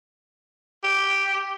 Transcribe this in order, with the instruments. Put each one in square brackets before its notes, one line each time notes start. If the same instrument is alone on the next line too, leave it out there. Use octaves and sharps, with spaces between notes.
[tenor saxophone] G4